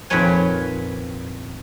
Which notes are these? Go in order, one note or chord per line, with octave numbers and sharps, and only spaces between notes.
F2 A#2 D#3 B4 C#5 G#5